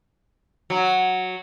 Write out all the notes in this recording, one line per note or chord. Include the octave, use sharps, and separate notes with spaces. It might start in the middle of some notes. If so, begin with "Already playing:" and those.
F#3